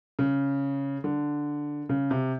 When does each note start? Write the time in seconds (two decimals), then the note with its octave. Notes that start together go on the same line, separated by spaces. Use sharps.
0.19 C#3
1.04 D3
1.89 C#3
2.11 C3